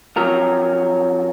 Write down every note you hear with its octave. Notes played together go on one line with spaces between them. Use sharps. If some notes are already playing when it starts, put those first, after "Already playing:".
F2 F#3 A#4